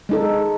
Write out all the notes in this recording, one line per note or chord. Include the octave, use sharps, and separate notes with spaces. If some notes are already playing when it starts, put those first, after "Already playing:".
G#3 D#4 A4